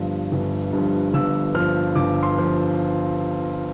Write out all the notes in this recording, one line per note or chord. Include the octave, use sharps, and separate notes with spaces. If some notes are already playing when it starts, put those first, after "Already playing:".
Already playing: G1 G2 F3
G1
G2 F3
G1 E6
G2 F3 F6
G1 D6
C6
F3